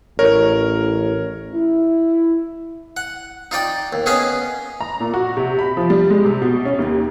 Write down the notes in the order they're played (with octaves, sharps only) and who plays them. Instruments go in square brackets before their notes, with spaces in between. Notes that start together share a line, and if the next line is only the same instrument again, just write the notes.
[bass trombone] A1 [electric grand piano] A#4 [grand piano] C#5
[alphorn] E4
[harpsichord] F#5
D#4 F4 D5 G5
D#2
B3 C#4 G#4 D#5 F5
[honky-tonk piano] A#5
A#2
F#4
C3
B5
F3
G3
G#3
C3
B2
C#4
D#2